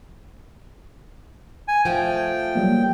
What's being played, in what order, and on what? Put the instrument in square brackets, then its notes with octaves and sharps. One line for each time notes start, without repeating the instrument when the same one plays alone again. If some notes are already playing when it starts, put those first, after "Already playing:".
[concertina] G#5
[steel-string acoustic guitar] F3 A3 [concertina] G5
[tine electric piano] F#3 G3 A#3